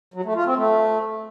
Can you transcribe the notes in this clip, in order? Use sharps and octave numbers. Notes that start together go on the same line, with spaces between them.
F#3
A3
F4
C4
A3